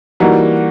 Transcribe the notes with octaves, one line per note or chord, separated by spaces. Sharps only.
E3 G3 A#3 D#4 F#4